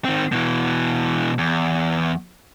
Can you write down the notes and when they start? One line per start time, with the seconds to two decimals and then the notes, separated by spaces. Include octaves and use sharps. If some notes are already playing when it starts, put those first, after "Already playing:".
0.05 D#3 C4
0.32 B2 E3
1.38 E2